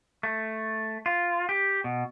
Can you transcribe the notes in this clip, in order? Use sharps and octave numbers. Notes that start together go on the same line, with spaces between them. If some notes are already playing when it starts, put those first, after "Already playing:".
A3
F4
G4
B2